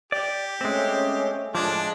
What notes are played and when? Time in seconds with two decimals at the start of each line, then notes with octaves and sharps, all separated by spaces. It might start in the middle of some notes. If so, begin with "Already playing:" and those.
0.12 G4 D5
0.61 G#3 A3 C4 C#4
1.55 A#1 A2 F3 G#3 D4 D6